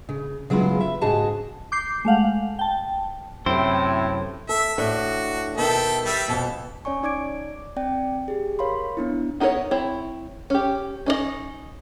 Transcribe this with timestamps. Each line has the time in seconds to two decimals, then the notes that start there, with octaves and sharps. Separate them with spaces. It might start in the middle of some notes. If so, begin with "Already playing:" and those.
0.09 C#3
0.50 C#3 F#3 G#3 B3 E4 F4
0.81 E5
1.01 G#2 C#3 F#4 G#4 A5
1.72 D6 G6 C7
2.05 G#3 A3 F5 F#5
2.59 G5 A5
3.46 F#2 A2 C3 C4 E4 C5
4.49 A4 E5
4.78 A2 D4 F#4
5.58 B2 D#3 A4 E5 G5
6.05 G3 E5
6.28 F2 B2 A4
6.85 C#4 C#5 D5 G#5 C#6
7.03 D#4 D5 D6 G#6 D7
7.76 C4 D5 G5
8.28 G4 G#4
8.59 A#4 C#5 F5 B5 C6
8.97 B3 D4 E4
9.40 B3 D#4 E4 A4 C#5
9.71 C4 E4 C#5
10.50 C#4 G4
11.06 C#4 D#4 F4 D#5